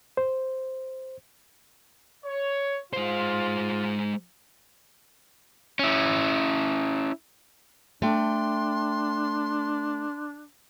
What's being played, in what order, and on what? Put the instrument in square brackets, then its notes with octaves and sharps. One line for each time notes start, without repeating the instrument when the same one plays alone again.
[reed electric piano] C5
[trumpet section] C#5
[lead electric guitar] G#3 C5 [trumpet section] F4
[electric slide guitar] C#4 E4
[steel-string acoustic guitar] A3 G5 [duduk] D4 [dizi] C6